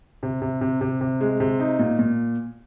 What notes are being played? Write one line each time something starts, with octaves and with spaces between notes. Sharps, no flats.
C3
C3
C3
C3
C3
G#3
C3
D#4
A#2
A#2